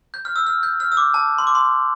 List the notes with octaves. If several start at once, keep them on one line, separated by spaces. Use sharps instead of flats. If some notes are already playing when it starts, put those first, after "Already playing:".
G6
F6
E6
F6
G6
F6
E6
D6
A5
C6
D6
C6